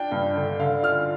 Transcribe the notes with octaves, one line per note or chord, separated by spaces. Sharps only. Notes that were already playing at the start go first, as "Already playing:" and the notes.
Already playing: D4 F4 G5
G2
D3
D3 F5
F4 F6